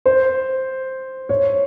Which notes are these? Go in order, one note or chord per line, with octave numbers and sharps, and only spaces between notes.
C5
C#5